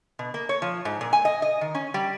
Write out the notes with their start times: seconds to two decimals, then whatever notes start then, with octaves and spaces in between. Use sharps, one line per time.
0.19 B2
0.34 A#3
0.49 C#5
0.62 F3
0.85 G#2
1.01 A#2
1.13 G#5
1.25 D#5
1.42 D#5
1.61 D#3
1.75 C#4
1.94 G3